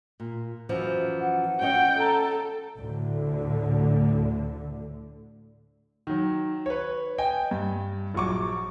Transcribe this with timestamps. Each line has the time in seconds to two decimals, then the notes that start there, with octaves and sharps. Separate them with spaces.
0.20 A#2
0.69 F#2 E3 F3
1.20 F#5
1.61 C#4 C#5 D#5 G5
1.99 A4 A#5
2.79 D2 A2 D3
6.07 D#3 F#3
6.66 B4 C#5
7.18 D#5 G5 G#5
7.51 G2
8.14 A#1 F#3 C#6 D6